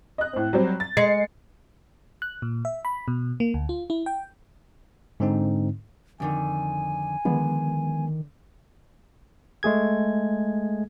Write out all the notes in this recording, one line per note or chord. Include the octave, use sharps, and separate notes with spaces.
D#5 F#6
A2 C4
F#3 G3 C4
A6
G#3 C7 C#7
F#6
A#2
E5
B5
B2
A#3
D2
F4
E4
G5
G#2 D3 C4 D#4
F2 D3 D#3 G#5
D3 D#3 F3 G#3 B3
G#3 A3 G#4 G#6